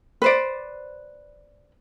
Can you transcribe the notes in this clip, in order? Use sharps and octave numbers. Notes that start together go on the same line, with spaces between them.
B4 C5 D5